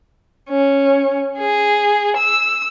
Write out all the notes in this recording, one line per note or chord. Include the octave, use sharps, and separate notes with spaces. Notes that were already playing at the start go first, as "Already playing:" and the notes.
C#4
G#4
E6